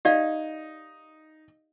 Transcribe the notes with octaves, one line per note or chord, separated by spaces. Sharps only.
D#4 G4 D5 F5